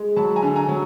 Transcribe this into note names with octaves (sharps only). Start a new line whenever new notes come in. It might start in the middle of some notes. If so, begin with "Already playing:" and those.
Already playing: G#3
F#3 A5 B5
G#5 A#5
D3
G#5 A#5
F#3